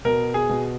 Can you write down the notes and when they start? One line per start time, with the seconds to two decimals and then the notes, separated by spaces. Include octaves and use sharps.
0.05 B2 A#4
0.34 G#4
0.49 B2